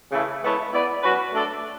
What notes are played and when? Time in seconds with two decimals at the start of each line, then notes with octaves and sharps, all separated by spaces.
0.11 C#3 E3 A3
0.42 G#3 B3 E4 A4 C#5
0.71 B3 E4 B4 D5
1.01 F#3 C#4 F#4 B4
1.32 A3 D4 A4 D5